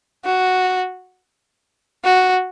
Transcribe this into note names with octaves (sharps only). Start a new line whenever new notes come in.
F#4
F#4